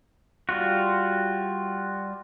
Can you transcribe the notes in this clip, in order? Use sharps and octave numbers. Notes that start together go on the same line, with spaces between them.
G3 F4 F#4